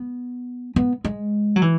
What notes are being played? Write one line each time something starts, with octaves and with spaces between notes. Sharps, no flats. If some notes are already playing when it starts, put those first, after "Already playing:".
Already playing: B3
B3
G#3
F#3
E3